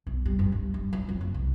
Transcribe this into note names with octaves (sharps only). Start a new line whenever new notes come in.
B1
G3
G2
G2
G2
F#3
F2
F#1
C2